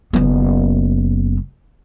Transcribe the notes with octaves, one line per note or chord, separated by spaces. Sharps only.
F#1 B3